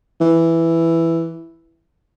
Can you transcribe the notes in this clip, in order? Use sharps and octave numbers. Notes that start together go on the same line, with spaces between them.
E3